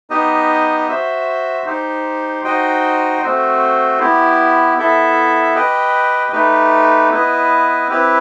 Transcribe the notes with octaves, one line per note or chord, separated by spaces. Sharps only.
B3 D#4 G4 D#5
F#4 C5 E5
D#4 G4 C5
D#4 F#4 C5 D#5 G5
A3 C4 F#4 C5
B3 E4 G4
B3 E4 A4 E5
G4 B4 D#5 G5
A3 D#4 G4 B4
B3 E4 B4 D#5
C4 E4 G4 B4